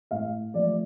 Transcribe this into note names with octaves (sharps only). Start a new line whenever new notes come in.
A2 F5
F3 A3 D5